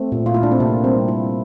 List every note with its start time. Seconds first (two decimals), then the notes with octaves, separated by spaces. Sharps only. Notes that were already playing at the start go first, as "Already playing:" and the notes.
Already playing: A3 C4
0.12 A#2
0.26 F4
0.34 A3 E4
0.43 D4
0.51 C4
0.60 C3 A#3
0.84 G3 C4
1.08 A#3 E4